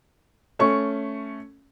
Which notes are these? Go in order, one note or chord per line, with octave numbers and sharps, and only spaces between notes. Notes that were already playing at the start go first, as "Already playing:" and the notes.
A3 C#4 C#6